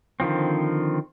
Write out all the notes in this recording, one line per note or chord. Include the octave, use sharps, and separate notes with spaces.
D3 D#3 F3 C4